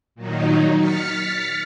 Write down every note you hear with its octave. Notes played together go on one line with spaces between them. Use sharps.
A#2 D#3 F#3 D#4
F6 A6 B6 C#7